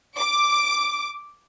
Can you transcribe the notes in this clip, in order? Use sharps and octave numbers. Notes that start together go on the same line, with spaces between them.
D6